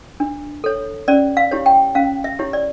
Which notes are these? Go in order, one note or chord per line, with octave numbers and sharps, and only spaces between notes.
D4
A4 C#5
C#4 D5
F5
E4 G4 C#5
G5
C#4 F5
E5
E4 G4 C#5
D5